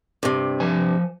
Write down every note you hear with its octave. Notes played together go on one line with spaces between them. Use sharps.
G2 C3
F3 C5 G#5